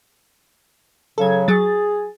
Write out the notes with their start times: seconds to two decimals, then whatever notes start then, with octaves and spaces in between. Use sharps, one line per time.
1.18 C#3 F#3 A4 G#6
1.48 F#3 G#4 A6